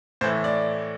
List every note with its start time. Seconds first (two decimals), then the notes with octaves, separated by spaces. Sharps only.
0.21 A2 C5
0.24 E3 A3
0.44 D5